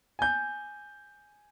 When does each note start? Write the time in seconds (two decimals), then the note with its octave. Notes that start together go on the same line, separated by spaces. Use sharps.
0.19 G#5 G6